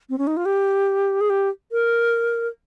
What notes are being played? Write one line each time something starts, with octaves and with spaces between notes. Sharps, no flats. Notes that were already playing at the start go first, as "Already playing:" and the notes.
C4
C#4
D#4
F4
G4
G#4
G4
A#4